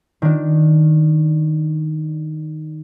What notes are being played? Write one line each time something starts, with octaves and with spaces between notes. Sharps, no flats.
D#3 D4